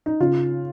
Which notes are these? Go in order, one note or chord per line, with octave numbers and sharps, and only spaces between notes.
D#4
C#3 F4